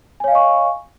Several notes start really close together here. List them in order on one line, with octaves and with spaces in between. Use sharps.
G#5 C#5 F5 D#5 C#6